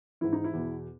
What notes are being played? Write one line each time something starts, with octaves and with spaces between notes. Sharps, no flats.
G#2 E3 E4
D#4
E4
E2 B2